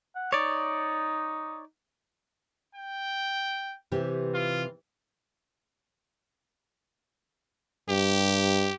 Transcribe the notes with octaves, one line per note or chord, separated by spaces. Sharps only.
F#5
D#4 C#5 D5
G5
C3 E3 G4
F4
G2 G4